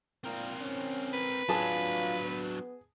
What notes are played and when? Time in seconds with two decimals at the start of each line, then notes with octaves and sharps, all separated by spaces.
0.24 A#2 C4 A#4
0.61 C#4
1.13 B4
1.49 F#3 D4 F4 G#4 A5
2.24 B3